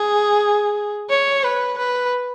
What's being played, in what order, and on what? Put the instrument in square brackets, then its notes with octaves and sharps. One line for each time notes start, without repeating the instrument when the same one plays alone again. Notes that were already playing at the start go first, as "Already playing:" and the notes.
Already playing: [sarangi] G#4
C#5
B4
B4